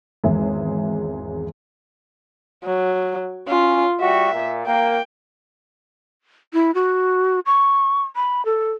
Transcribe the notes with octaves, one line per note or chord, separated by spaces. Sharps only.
G#1 E2 G#3 G#4 C#5 E5
F#3
C#4 F4
G3 F#4 E5
A#2
A#3 G5
E4
F#4
C#6
B5
A4